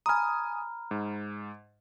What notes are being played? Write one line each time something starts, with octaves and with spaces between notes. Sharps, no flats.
G#5 A#5 B5 D#6 F6
G#2